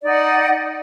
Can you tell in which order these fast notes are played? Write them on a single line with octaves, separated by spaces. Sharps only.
D5 D#4 F#5